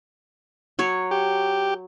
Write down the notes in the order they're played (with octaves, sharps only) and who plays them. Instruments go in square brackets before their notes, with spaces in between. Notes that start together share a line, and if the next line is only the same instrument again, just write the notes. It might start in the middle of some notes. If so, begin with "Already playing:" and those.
[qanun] F#3 C#5
[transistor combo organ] G4